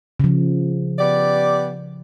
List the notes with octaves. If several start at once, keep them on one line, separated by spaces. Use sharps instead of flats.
C#3 F3
B3 G4 D5